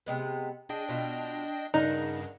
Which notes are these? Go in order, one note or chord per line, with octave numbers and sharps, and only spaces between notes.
C3 G#3 B3
D4 G#4 D#5 G5
B2 F4
G2 C#3 D4 D#4 A#4 F#5